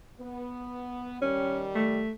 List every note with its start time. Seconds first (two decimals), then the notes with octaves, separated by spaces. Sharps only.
0.20 B3
1.22 D#3 G3 C#4
1.75 A3